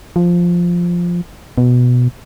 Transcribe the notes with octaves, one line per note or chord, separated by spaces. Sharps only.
F3
B2